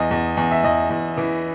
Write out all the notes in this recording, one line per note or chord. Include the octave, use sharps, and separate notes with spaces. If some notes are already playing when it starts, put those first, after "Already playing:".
Already playing: E2 D#5
E2
E2
E5
E2 D#5
E2
E3